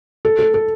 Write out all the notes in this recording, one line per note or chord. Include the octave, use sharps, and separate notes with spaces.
A4
A4
A4